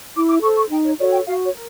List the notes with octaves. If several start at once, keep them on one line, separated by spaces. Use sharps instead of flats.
E4 D6
D6
A4 C5 C#6
C#6
D#4 G5
C#5
F#4 A4 C#5 D5
G5
F#4 F5
C#5
A#4